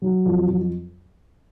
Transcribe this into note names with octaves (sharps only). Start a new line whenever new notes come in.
F#3
F2
F2